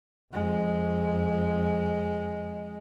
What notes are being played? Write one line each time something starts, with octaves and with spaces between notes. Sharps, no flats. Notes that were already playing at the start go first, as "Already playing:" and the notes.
F2 G#3